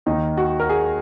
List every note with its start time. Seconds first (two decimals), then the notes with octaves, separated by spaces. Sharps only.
0.06 D#2 D#3 D#4
0.37 F#4
0.60 A#4
0.69 G#4